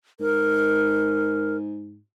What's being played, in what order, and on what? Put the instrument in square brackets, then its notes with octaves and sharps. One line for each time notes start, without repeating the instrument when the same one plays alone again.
[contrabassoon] G#2 [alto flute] A#4